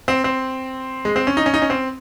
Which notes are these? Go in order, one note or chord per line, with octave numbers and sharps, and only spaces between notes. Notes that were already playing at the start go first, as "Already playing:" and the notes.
C4
C4
G#3
C4
C#4
D#4
C#4
D#4
C#4
C4